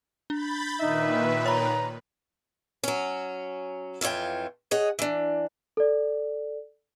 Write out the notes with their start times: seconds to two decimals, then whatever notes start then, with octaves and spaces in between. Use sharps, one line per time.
0.30 D4 B5 G6 A6
0.80 A#2 D#3 D#4 B4 E5
1.46 C#5 A#5 B5
2.83 F#3 C#4
4.01 F2 E3 F4 C#5 G5
4.71 G#4 C#5 D#5 F#5
4.99 E3 D4
5.77 A4 D5